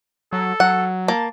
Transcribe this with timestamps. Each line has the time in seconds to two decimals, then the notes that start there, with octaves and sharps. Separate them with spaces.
0.33 F#3 A4
0.60 F#3 F#5
1.08 A#3 A5